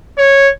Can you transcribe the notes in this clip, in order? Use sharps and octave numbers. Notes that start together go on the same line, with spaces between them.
C#5